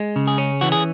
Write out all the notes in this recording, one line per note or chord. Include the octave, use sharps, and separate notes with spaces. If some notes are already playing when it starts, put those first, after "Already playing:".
Already playing: G#3
C#3
G#4
C#4
E3 F#4
G#4